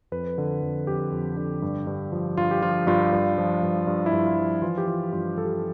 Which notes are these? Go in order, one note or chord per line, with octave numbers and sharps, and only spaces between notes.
F2 B4
D3
F2
F2 G4
F2
D3
G2
G2
F3
G2 F4
G4
F3 F4
G2 F4
G2
F3
G2
G2
E4
G2
F4
F3
E3 F4
G4
E3 F4
G2 F4
G2 A4
G4
F4